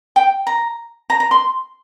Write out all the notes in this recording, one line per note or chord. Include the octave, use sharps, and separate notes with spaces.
G5
A#5
A#5
A#5
C6